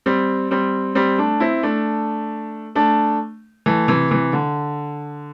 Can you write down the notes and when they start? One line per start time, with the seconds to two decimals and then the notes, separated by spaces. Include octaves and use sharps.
0.06 G3 C4
0.51 G3 C4
0.95 G3 C4
1.18 A3 D4
1.40 C4 E4
1.63 A3 D4
2.75 A3 D4
3.66 E3 A3
3.88 C3 E3
4.11 C3 E3
4.33 D3